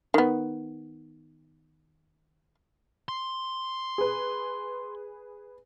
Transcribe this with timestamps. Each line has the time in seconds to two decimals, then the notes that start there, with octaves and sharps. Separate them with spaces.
0.14 D#3 B3
3.09 C6
3.98 G#4 B4